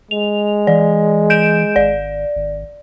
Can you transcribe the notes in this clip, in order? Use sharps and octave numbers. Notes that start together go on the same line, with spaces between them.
G#3 F7
E3 D5
G6 D7 E7
G#1 D5
G#1